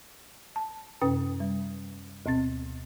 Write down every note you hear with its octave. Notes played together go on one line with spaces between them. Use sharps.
A5
F#2 C3 C#4 B4 G5 D#6
G3
D2 B2 C4 A6